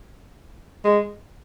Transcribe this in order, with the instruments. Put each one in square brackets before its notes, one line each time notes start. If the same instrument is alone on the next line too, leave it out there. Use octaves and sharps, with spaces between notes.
[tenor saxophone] G#3